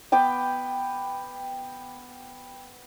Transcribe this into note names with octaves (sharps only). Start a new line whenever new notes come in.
B3 B4 G5 D6